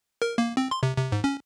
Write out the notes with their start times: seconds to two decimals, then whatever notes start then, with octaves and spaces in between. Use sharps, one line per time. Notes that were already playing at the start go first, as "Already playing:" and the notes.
0.22 A#4
0.38 A#3
0.57 C4
0.71 C6
0.83 C3
0.97 C3
1.12 G#2
1.24 C#4